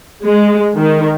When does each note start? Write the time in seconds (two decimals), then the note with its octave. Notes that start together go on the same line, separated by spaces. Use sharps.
0.24 G#3
0.78 D#3